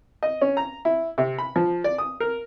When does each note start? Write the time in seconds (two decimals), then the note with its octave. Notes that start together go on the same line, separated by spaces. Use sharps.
0.23 D#5
0.42 C#4
0.57 A#5
0.85 E4
1.18 C3
1.39 B5
1.56 F3
1.84 D5
1.98 D#6
2.20 A#4